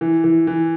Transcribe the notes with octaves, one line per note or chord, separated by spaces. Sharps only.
E3
E3
E3